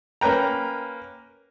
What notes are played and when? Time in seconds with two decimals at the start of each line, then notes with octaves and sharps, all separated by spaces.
0.21 A#3 C#4 B4 G5 A#5